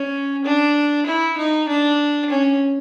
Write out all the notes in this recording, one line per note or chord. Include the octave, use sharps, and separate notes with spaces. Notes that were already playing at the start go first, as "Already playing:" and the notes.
Already playing: C#4
D4
E4
D#4
D4
C#4